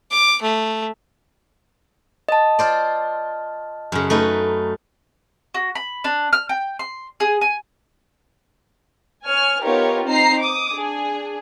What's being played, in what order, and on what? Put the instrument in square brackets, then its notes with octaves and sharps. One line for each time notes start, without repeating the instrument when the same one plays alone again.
[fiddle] D6
A3
[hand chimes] D#5 A5
[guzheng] F4 C5 D5
F#2 C#3
A3 D#4 B4
[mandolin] F#4
B5
D4
F6
G5
C6
G#4
G#5
[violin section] C#5 G#5 F6
B3 D#4 F4 G4 A#4 C#5
C4 D#4 C5 A#5 C7
D6 D#6
D4 G#4